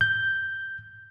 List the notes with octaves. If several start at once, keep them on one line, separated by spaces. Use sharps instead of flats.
G6